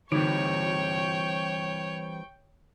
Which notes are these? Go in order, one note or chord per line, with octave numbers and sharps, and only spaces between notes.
D3 E3 G3 C4 D#4 C#5 G5 C#6